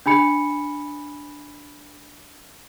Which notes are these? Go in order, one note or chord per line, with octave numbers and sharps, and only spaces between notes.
D4 G#5 B5 C#7